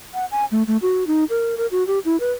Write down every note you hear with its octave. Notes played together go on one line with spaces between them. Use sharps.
F#5
G#5
A3
A3
F#4
D#4
A#4
A#4
F#4
G4
E4
B4